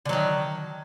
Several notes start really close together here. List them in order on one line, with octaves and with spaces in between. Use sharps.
D3 F#3 D#3